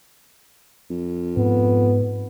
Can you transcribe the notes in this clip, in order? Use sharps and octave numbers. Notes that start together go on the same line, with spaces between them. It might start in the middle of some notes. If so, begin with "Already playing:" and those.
F2
G#2 B3